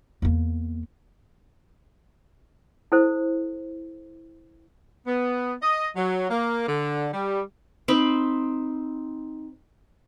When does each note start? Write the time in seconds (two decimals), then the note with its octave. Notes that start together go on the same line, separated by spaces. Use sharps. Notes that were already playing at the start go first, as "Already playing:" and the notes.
0.22 E2 A#3
2.92 E4 A4 C5
5.07 B3
5.62 D#5
5.96 F#3
6.30 A#3
6.68 D3
7.13 G3
7.88 C4 D#4 B5